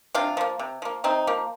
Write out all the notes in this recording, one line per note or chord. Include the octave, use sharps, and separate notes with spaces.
C3 D4 F4
F3 A#3
C3
F3 A#3
C3 C4 D#4
F3 A#3